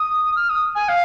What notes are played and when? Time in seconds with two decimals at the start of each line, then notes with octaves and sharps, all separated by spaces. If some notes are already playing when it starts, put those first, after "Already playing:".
Already playing: D#6
0.36 F6
0.49 D#6
0.75 G#5
0.88 F5